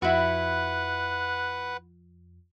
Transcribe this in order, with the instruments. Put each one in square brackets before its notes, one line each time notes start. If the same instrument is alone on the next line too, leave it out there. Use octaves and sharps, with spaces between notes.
[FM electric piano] F2 [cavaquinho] E4 F#4 [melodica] B4 F#5